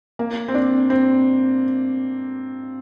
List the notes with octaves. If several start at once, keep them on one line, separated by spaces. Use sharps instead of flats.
A#3
C4
D4
C4